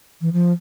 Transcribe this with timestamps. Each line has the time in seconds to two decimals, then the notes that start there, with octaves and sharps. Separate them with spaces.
0.21 E3
0.33 F3